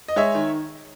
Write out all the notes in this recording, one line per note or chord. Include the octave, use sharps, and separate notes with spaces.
D#5
G#3 C#5 E5
D#3